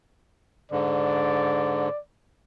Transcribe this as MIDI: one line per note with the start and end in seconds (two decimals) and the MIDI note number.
0.72 1.89 44
0.72 1.89 50
0.72 1.99 74